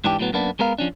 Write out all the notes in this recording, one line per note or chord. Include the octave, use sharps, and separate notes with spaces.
G#2 E3 D4 G4
A2 F#3 B3
F#2 A#3 B3 D4
G#3 B3 A#4 F5
F3 C#4 D4